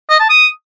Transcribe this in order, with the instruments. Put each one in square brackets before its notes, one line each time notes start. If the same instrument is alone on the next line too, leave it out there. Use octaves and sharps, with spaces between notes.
[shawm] D#5
A5
D#6